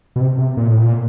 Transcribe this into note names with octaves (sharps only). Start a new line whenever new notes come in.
B2
C3
C3
A#2
A2
A#2